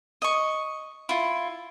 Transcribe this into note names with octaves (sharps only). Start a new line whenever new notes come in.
D#5 C#6
E4 F4